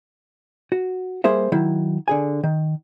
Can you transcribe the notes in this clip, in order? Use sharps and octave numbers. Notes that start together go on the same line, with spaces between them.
F#4
G3 A#3 G#4 C5 E5
D#3 F#3 E4
D3 G#4 G#5
D#3